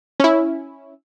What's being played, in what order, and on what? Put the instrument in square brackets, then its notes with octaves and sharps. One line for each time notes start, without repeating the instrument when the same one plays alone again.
[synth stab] C#4 E4